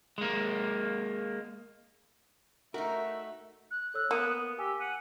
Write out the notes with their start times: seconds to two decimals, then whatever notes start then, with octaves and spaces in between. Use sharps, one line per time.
0.18 G#3 A#3
2.74 A3 D#4 F#4 A#4 E5
3.71 F#6
3.94 A4 C#5 E6
4.11 A#3 B3 D#6 C#7 D#7
4.59 G4 G#5 E6
4.80 F#5 D#7